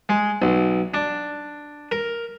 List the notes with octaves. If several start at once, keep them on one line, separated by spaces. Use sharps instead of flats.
G#3
B1
D4
A#4